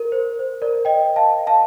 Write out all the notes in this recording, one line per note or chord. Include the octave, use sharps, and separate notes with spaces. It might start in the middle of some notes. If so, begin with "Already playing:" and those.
Already playing: A#4
C5
A#4
C5
A#4 D5
D#5 G5
F5 A5
F5 A5